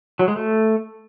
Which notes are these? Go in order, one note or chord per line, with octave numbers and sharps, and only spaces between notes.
F#3
G#3
A3